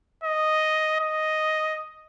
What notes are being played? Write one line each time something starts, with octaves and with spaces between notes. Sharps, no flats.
D#5
D#5